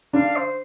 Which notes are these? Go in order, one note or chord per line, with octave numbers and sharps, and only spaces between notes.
D3 D4 F5
C5